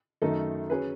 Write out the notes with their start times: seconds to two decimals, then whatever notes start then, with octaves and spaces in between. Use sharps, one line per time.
0.22 F#2 D#3 A3 D#4 A4
0.70 F#3 C#4 G#4 B4